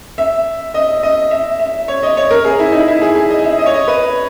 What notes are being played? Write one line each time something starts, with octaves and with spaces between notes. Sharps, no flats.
E5
D#5
D#5
E5
E5
C#5
D#5
C#5
A#4
G#4
E4
D#4
E4
G#4
G#4
D#5
E5
D#5
C#5
D#5
B4